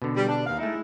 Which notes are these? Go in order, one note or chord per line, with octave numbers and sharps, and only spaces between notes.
B2 D3
G3
D4
D#2 F5
G#3 A3 D#4 E4